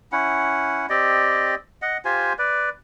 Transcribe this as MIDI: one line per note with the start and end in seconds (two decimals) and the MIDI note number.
0.12 0.86 61
0.12 0.86 64
0.12 0.86 78
0.90 1.55 60
0.90 1.55 67
0.90 1.55 74
0.90 1.55 75
1.82 1.97 75
1.82 1.97 78
2.05 2.33 65
2.05 2.33 67
2.05 2.33 72
2.05 2.33 80
2.39 2.70 71
2.39 2.70 74